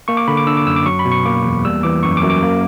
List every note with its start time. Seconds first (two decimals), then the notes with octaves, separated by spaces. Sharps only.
0.08 A#3 C#6
0.17 D6
0.28 D3 B5
0.37 D6
0.47 D4 E6
0.57 D6
0.67 F#2 E6
0.76 D6
0.86 F#3 C#6
0.99 B5
1.05 B2
1.12 C#6
1.26 A#3 D6
1.45 E2
1.65 G3 E6
1.83 E3 D6
2.03 F#2 C#6
2.17 D6
2.22 F#2
2.30 D6
2.42 A#3